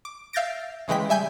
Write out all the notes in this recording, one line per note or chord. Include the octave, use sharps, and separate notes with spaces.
D6
E5 F5 G6 A6 A#6 D7
C#3 E3 G#3 G5 B6
G3 E5 G#5 G6